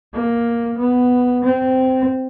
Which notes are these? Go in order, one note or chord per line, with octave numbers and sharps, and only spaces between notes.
A#3
B3
C4